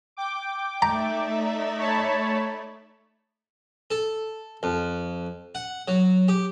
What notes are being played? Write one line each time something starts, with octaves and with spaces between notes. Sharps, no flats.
G5 D6
A3 D#4 D5 E5 A#5
C#5 A5 B5
A4
F2
F#5
F#3
G4